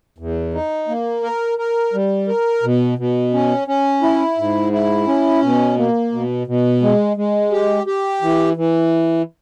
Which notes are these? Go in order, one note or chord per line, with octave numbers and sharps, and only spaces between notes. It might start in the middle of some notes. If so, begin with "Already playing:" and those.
E2
D#4
A#3
A#4
A#4
G3
A#4
B2
B2
C#4
C#4
E4
G#2
E4
C#4
B2
A#3
B2
B2
G#3
G#3
G4
G4
E3
E3